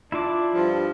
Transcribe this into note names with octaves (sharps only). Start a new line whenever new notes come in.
D4 E4 F4 D6
G2 F3